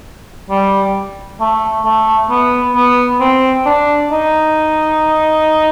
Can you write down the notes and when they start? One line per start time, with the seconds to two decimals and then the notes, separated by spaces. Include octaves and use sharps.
0.50 G3
1.41 A3
1.85 A3
2.30 B3
2.76 B3
3.21 C4
3.66 D4
4.12 D#4